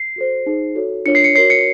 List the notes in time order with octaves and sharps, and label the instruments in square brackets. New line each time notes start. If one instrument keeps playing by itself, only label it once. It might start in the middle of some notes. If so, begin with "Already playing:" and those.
Already playing: [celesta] C7
F#4 A4 C5
D#4 G#4 C5
F#4 A4 C#5
D4 F4 A#4 C#5 C#7
C7
C#7
F#4 A#4 C#5 C7
C#7